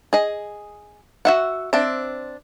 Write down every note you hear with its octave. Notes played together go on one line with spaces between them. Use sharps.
G#4 D#5
F#4 E5 F#5
C4 D4 E5